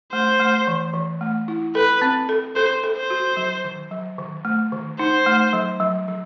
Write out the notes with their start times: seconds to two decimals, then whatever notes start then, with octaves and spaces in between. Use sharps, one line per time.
0.12 A3 C5
0.40 A3
0.67 E3
0.94 E3
1.21 A3
1.48 E4
1.75 A4 B4
2.02 C4
2.29 A4
2.56 A4 C5
2.84 A4
2.96 C5
3.10 F#4
3.37 F#3
3.64 D#3
3.91 F#3
4.18 D#3
4.45 A3
4.72 D#3
4.99 D#4 C5
5.26 A3
5.53 F#3
5.80 F#3
6.08 F#3